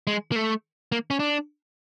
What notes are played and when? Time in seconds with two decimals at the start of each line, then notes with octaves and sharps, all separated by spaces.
0.07 G#3
0.32 A#3
0.36 A3
0.92 A#3
1.11 C#4
1.20 D4